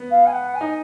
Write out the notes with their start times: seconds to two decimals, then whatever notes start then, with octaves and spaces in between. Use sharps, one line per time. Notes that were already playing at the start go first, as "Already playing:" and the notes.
Already playing: B3
0.10 F5
0.26 G#5
0.32 F#5
0.54 G#5
0.61 D#4